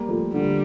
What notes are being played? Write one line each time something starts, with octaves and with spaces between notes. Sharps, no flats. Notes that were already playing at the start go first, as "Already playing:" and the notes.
Already playing: G3 A#3
F3 A3
D3 G3